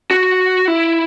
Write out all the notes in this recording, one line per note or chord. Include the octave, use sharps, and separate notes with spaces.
F#4
E4